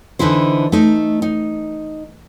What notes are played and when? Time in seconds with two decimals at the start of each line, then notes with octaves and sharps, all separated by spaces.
0.19 D3 E3 D#4 E4 C5
0.72 A3 D#4
1.22 D#4